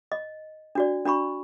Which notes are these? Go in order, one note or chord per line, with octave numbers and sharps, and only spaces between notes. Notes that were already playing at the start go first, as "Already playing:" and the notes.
D#5
D4 F#4 D5
D4 F#4 B5 C#6